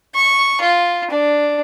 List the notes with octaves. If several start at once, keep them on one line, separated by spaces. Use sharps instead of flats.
C#6
F4
D4